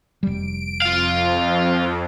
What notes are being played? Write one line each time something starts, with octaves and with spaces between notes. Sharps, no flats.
F1 G3 D7
F2 F4 F5